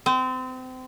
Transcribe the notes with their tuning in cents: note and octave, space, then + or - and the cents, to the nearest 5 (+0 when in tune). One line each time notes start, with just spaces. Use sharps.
C4 -30